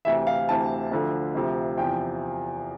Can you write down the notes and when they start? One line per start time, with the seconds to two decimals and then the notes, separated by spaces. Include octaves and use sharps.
0.05 D2 C3 E3 E5
0.27 F5
0.49 D2 C3 E3 A5
0.91 D2 D3 F3
1.35 D2 C3 F3
1.77 E2 C3 F3 G5